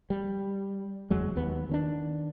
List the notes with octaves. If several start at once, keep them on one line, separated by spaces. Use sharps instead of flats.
G3
F#1 E2 F#3 G#3
D#2 B3
D#3 C#4 D4